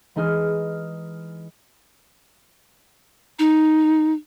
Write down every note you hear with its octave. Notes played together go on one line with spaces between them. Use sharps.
E3 G#3 D#4 G#4 F6
D#4